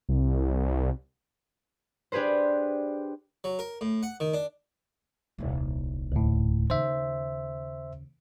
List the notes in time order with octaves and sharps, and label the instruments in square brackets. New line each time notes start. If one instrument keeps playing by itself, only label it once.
[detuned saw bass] C2
[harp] D4 G4 G#4 B4 C5
[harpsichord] F#3
A#4
A2
F#5
D#3
D4
[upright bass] D#1 C2
[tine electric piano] D2 A2
[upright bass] D#2 C#3 [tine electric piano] C5 E5